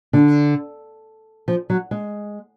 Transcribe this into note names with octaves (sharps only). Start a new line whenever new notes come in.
D3
F3
F#3
G#3